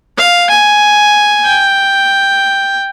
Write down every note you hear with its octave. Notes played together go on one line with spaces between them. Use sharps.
F5
G#5
G5